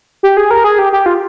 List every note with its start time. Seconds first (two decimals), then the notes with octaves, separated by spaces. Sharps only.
0.23 G4
0.37 G#4
0.51 A#4
0.64 G#4
0.79 G4
0.93 G4
1.06 F4